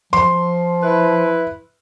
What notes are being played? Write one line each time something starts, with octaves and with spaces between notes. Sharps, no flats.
F3 C6
E4 B4